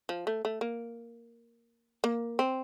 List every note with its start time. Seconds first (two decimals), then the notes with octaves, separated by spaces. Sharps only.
0.09 F3
0.27 A3
0.45 A3
0.61 A#3
2.04 A#3
2.39 C4